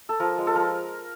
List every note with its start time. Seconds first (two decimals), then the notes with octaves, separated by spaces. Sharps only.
0.09 A4
0.20 F3 A#4
0.38 G#3
0.47 A4
0.55 F3 A#4